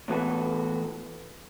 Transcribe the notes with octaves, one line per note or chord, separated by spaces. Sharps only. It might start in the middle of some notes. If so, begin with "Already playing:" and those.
A2 E3 B3 F#4 A4